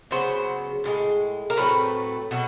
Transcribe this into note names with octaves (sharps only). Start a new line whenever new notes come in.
C#3 F#3 B3 C5
A2 F3 G#3
A#4
A2 F#3 A3 C4 B4
B2 F#3